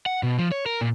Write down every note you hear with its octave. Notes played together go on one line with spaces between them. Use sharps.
F#5
B2
F3
C#5
A#4
A#2